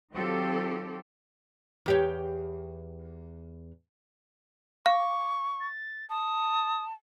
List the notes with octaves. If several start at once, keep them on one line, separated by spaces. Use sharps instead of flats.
D#3 F#3 C4 F4 G4 A4
E2 G4 C#5
F5 C#6 D6
A6
A5 D#6